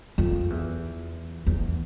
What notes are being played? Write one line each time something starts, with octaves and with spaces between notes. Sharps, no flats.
F2
E2
E2